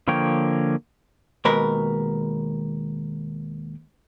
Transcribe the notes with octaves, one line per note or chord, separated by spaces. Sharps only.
D3 F3 A#3 C#5 G5
D#2 B2 G#3 A#4 B4